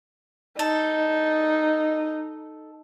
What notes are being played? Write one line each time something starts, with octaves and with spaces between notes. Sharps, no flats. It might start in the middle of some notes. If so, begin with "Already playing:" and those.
D#4 A4